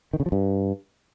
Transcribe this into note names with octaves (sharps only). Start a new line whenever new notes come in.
D#3
C#3
F3
G2